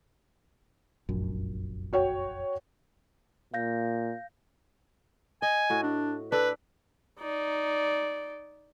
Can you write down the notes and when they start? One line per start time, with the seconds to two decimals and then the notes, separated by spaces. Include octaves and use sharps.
1.09 F1 A#1 F#2
1.93 F#4 C#5 G5
3.54 A#2 F5 G6 A#6
5.42 D#5 G#5
5.70 A2 F#4
5.83 D4
6.32 D4 A4 B4
7.20 D#4 D5